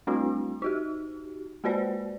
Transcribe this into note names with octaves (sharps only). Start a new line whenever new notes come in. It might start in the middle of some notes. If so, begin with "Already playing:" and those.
G3 A3 C4 D4 E4 F#4
D#4 F#4 G4
G#3 A#3 F#4 B4 C5 D5